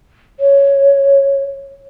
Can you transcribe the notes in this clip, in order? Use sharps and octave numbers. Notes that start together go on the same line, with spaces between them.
C#5